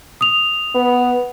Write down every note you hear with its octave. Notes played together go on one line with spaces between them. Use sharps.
D#6 F7
B3